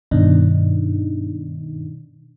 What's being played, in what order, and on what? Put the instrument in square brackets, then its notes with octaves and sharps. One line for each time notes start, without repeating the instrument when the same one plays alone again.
[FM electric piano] G2 B2 D#3 D4 D#4